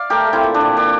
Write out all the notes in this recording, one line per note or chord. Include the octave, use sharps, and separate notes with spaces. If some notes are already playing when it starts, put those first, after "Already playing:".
Already playing: D5 F5
A3 G4 A#4
A3
C4 E4
A#2
D4
A#2
A#2 D4